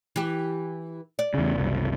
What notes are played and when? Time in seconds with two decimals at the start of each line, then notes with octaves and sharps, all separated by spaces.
0.16 E3 G4
1.19 D5
1.34 E2 C#3
1.54 F#1 C2